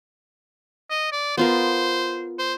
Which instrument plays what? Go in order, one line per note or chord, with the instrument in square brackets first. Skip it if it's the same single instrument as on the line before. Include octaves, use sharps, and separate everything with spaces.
[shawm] D#5
D5
[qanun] B3 F4 A#4 [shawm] C5
[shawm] C5